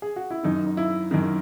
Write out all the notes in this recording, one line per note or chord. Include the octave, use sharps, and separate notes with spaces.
G#4
F#4
E4
F#2 D#3 D#4
D#4
E4
F#2 D#3